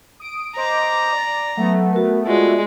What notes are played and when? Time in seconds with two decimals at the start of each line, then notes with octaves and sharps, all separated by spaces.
0.20 D#6 D7
0.56 C5 D#5 A#5 D6
1.12 D5
1.57 F#3 A3 B3 F#5
1.93 F#4 A#4
2.27 G#3 F4 F#4 D5